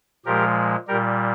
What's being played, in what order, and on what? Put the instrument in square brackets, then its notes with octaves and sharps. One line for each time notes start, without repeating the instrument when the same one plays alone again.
[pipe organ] A#2 F3 G#3 G4 A#4
A#2 G3 G4 A#4